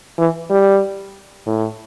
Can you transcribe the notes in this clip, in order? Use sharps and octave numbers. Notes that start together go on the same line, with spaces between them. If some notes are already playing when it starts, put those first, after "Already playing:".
E3
G3
A2